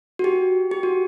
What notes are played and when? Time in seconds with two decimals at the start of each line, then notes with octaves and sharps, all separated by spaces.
0.19 F#4
0.24 G4
0.71 G4
0.83 F#4